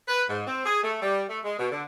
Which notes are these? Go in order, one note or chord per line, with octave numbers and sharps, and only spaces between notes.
B4
G#2
C4
G#4
A3
G3
A3
G#3
B2
D3